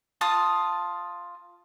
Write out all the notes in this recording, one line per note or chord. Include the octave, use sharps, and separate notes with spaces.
F4 A5 D#6